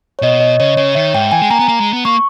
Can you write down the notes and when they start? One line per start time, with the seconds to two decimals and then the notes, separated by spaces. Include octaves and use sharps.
0.19 C#5
0.22 B2 D#5
0.40 D#5
0.60 C#3 C#5
0.77 C#3 C#5
0.95 D#3 E5
1.14 G#2 G5
1.31 E3 G#5
1.42 G#3
1.50 A#3 A#5
1.59 B3
1.68 A#3
1.80 G#3
1.93 B3
2.05 A#3 C#6